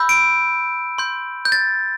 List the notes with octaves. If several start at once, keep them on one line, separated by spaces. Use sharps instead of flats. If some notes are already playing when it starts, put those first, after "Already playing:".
Already playing: B5 E6 G6
D7
C6 G6
G6
A6